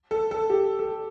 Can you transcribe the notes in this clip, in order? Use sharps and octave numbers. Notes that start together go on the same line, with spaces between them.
A4
A4
G4
A4